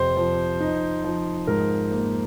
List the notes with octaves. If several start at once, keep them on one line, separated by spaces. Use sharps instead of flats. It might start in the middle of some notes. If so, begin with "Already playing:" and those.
Already playing: F2 C3 C4 C5
F3
D#4
F3
G#2 A#4
A#3